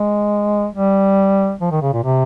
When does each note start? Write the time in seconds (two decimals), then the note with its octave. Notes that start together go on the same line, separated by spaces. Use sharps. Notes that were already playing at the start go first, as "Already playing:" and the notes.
Already playing: G#3
0.75 G3
1.61 F3
1.71 D#3
1.82 C#3
1.93 A#2
2.03 C3